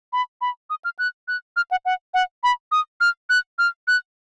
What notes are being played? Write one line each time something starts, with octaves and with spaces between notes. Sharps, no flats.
B5
B5
D#6
F6
F#6
F#6
F6
F#5
F#5
F#5
B5
D#6
F6
F#6
F6
F#6